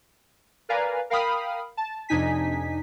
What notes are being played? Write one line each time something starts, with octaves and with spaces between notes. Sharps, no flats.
A#4 B4 D5 F5 G#5 A#5
A#4 F5 G5 B5 D#6 F6
A5
F2 C3 D4 D#4 G#5 B6